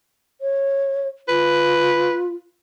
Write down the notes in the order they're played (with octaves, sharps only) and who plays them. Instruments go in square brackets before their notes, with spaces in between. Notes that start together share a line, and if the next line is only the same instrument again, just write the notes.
[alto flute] C#5
[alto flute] F4 [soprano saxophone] B4